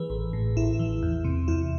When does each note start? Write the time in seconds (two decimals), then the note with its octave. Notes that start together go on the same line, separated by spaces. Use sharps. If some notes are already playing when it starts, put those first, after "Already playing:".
Already playing: E3 G#4 B4
0.10 A1
0.33 A2
0.56 A1 E4
0.79 E3
1.03 E2
1.25 C3
1.48 E2 E4